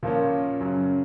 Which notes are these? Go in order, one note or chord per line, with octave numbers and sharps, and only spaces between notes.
A#2 F3 A#3 C#4
F#2 C#3 F#3